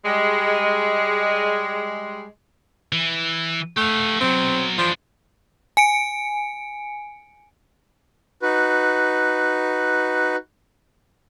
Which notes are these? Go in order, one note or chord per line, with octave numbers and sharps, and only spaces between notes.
G3 G#3
E3
A3 G4 F5
B1 F#3 C4
E3 F3 D4
G#5 C#7 D7
D#4 F#4 B4